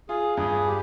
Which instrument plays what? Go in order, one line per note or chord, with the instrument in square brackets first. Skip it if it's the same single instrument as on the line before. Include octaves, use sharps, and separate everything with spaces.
[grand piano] F4 [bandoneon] G#4
[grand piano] G2 [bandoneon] G#4
[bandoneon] G4